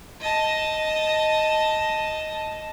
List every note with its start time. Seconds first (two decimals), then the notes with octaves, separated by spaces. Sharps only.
0.21 D#5 A5